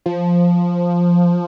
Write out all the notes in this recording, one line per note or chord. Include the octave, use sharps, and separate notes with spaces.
F3